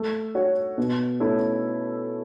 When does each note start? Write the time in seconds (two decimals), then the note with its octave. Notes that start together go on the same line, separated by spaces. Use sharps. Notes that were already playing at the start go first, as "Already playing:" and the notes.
Already playing: A3
0.35 F#4 C#5
0.78 B2
1.20 A3 C#4 E4 A4